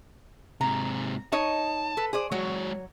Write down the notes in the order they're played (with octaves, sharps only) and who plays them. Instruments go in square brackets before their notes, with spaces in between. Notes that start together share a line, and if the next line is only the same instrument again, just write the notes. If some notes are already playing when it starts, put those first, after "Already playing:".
[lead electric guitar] G#2 C3 [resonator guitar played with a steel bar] A#5
[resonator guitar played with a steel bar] D#4 C#5 D#5 [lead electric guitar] A5
[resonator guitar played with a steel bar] A4 B4
G#4 C5 D5
[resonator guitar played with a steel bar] F#3 C#5 [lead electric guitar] G#3 F#4